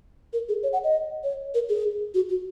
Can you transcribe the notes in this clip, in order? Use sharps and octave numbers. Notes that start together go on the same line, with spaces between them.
A#4
G#4
C#5
F#5
D#5
C#5
A#4
G#4
F#4
F#4